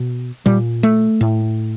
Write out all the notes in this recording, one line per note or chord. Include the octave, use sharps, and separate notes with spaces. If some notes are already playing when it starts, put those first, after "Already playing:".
Already playing: B2
A#2 G3
A3
A2